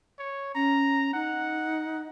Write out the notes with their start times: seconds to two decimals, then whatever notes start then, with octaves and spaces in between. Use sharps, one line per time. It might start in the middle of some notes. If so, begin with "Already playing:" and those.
0.19 C#5
0.55 C#4 A#5
1.13 D#4 F#5